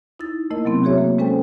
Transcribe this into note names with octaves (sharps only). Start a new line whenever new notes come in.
D#4 E4 A6
A3 A#3 E4 A#4 D#5
C3 F#3 B3 C4
F#4 G#4 C#5 E5
A#3
G#3 C#4 A4 C5 G5 G#5